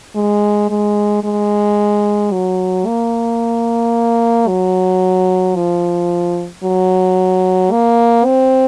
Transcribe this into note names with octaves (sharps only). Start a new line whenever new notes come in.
G#3
G#3
G#3
F#3
A#3
F#3
F3
F#3
A#3
C4